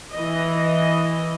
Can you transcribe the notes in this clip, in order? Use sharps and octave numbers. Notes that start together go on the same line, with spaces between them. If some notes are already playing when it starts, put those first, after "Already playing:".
E3 D#5